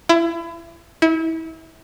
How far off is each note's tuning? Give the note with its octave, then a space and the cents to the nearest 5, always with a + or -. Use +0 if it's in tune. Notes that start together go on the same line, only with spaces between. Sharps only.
E4 +30
E4 -30